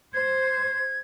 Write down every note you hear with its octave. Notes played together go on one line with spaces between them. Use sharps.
C5 G#6